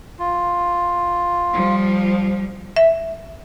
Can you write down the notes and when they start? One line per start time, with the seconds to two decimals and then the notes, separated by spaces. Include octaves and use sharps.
0.19 F4
1.53 F3 G3
2.76 E5